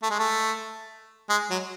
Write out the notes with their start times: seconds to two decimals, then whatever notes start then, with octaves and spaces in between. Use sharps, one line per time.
0.03 A3
0.10 G#3
0.19 A3
1.30 G#3
1.50 F#3